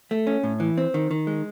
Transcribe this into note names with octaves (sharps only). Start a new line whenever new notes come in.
A3
C#4
A2
E3
C4
D#3
D#3
G#3